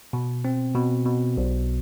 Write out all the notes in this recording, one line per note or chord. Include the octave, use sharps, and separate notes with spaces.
B2
C4
B2
B2
B1